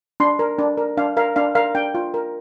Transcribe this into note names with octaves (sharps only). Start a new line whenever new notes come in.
D4 C6
A#4
D4
A#4
D4 F5
A#4 F5
D4 F5
A#4 F5
D4 G5
F4
A#4